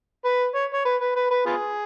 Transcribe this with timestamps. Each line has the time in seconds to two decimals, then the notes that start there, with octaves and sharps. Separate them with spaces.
0.25 B4
0.55 C#5
0.74 C#5
0.85 B4
1.01 B4
1.16 B4
1.31 B4
1.46 B3 F4 G#4